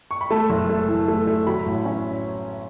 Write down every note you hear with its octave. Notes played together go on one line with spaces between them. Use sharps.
C#6
B5
A3 A5
F#1
A3
E3
A3
A3
F#3 B5
A1
C#4